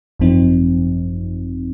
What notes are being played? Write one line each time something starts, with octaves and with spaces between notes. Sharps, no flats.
G#1 F#2 F3 C4 D#4